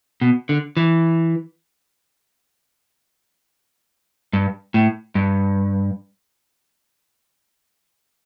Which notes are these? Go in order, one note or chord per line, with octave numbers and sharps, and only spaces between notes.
B2
D3
E3
G2
A2
G2